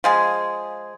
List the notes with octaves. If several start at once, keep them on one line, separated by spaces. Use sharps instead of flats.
F3 G#3 G#4